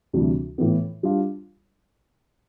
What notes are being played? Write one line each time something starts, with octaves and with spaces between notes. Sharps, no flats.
D2 C3 E3 G3 D4
A2 E3 B3
G3 D4 F4